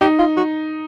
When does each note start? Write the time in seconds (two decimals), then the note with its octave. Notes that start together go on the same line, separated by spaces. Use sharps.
0.01 D#4 G4
0.19 F4
0.37 F#4